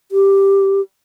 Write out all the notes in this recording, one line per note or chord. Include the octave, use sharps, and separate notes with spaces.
G4